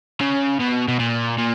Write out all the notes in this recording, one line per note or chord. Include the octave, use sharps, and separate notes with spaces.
C#3
B2
B2
A#2
A#2